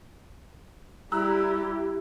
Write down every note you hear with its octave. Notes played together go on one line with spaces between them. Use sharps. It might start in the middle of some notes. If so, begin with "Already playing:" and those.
G3 E4 G4 A#5 E6 F#6